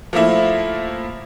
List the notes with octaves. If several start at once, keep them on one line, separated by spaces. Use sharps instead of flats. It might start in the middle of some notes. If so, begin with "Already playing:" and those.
F3 A3 A#3 E4